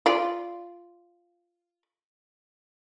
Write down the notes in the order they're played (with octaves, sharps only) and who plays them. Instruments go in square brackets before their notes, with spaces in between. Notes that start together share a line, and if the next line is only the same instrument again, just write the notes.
[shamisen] F4 D5